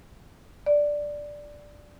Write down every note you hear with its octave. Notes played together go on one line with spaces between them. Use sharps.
D5